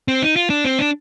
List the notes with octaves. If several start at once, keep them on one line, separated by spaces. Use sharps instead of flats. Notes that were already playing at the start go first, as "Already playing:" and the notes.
C4
D#4
F4
D4
C4
D4